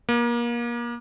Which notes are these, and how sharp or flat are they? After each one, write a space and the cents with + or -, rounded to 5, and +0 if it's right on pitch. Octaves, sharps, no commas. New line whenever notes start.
A#3 +30